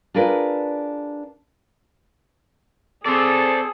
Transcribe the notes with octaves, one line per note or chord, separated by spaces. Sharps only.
D4 F4 G#4 A#4 B4 D5
C4 G#4 A4 C5 D5